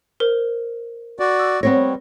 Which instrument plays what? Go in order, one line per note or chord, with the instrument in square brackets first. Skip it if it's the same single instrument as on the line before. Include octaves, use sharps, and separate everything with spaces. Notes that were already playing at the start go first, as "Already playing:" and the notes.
[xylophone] A#4 C5
[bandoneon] F#4 D5
[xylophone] E6
[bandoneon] G3 [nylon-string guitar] B3 C4 C#5 [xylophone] A#6